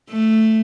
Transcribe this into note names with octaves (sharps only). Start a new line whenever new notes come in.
A3